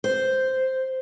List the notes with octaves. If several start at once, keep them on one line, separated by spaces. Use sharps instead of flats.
C5